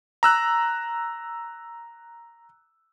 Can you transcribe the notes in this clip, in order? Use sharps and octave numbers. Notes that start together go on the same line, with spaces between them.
A#5 E6 F#6